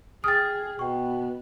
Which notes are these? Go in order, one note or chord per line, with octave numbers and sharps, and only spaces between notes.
G#4 G5 D#6 F6 A6
B2 B3 G5 C#6